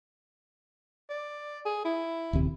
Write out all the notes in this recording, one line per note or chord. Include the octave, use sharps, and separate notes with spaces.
D5
G#4
E4
D#1 D#2 C3